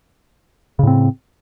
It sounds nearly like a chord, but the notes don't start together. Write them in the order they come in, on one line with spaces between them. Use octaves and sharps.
C#3 A2 C4